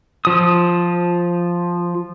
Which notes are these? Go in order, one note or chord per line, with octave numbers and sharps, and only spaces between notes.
F3 D#6